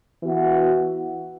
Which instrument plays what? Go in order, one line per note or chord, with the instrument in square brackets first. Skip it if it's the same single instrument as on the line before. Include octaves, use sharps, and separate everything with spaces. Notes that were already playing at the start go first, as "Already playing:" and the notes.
[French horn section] E3 B3 F#4